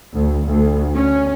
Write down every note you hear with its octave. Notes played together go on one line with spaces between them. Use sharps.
D2
D2
C#4